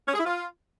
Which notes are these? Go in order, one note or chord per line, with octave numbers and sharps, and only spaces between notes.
C#4
G#4
E4
F4